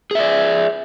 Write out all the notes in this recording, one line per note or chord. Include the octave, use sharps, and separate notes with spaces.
G#4 D5 E5